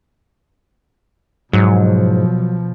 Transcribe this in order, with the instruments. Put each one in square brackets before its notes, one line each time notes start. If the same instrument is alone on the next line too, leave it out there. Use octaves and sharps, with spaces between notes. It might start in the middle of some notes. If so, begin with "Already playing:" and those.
[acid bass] G#2 [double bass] B2 F3 [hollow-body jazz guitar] F#3